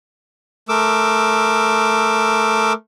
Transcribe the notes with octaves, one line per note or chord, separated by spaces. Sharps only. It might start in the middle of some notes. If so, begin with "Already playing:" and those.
A3 A#4 D6 E6